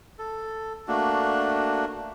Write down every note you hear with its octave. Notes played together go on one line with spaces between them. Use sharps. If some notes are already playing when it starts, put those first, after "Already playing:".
A4
A3 A#3 D4 F#4